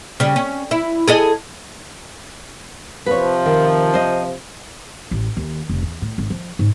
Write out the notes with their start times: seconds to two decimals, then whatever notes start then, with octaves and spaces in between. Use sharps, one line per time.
0.20 C#3 G3
0.36 C#4
0.71 E4
1.08 G#4 A4 D#5
3.06 C3 F3 B4 C#5
3.45 D#3
3.94 C5 D#5
5.11 A1
5.37 D#2
5.69 F1
5.82 E2
6.02 A2
6.18 G#1
6.30 F3
6.59 G#2